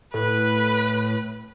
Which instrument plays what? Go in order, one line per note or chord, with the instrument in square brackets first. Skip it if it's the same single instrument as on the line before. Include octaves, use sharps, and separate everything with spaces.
[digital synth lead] A2 [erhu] B4